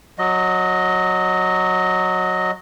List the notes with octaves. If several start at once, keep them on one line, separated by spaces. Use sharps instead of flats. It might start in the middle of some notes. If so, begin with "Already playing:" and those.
F#3 D#5